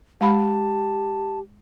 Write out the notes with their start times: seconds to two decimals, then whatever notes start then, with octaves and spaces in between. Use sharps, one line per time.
0.21 G#3 G4 F5 A5 B5